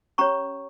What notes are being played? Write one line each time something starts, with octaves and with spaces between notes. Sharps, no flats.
C#4 G4 C#5 A#5 C#6